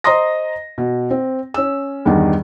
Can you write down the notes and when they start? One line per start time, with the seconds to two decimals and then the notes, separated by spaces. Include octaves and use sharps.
0.04 C5 D#5 A#5 C6 D#6 A#6
0.78 B2
1.11 C4
1.54 C#4 E6
2.05 E2 G2 D#3 D4 D#4